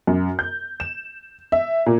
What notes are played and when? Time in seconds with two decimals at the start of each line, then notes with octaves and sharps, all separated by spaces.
0.07 F#2
0.39 G6
0.80 E7
1.52 E5
1.86 A#2